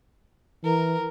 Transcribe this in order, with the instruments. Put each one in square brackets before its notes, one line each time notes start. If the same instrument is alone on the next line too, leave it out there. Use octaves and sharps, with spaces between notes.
[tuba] E3 [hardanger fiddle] A#4